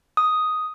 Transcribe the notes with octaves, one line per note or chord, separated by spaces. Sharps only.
D#6